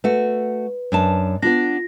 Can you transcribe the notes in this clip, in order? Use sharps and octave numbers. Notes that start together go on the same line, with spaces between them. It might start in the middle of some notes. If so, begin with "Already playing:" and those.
A3 F#4 B4
F#2 D4 A5
B3 D4 F4 A#6